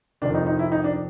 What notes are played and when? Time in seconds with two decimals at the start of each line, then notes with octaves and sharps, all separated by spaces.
0.22 F2 C3 D#3 D4
0.35 D#4
0.47 D#4
0.59 E4
0.72 D#4
0.84 D4